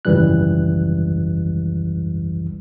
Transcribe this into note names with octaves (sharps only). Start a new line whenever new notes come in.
G#1 C#2 F#2 E3 G3 F#6